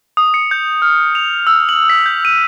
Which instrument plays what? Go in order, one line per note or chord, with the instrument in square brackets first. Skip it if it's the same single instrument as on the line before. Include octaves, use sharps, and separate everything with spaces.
[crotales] D#6
C#7
G6
F6
F7
E6
F#7
B6
G6
D#7